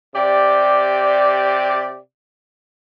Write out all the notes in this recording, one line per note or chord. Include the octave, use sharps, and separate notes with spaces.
C3 G4 D5